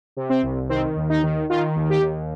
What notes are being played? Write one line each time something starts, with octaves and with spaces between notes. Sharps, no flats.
C3
C4
C2
D#3 C4
D#2
D#4
D#3
D#3 F4
D#2
G4
D#2